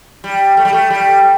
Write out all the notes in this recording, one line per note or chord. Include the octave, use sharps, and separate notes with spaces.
G3
A3
G3
A3
G3